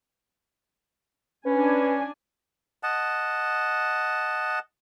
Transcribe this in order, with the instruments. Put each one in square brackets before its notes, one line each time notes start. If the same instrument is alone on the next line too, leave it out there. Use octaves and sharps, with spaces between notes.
[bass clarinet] C#4 [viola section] D4 G#5 [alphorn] B4
[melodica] D#5 F#5 A5